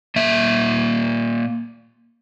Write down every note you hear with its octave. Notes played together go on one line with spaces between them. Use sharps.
A#2 A#3 E5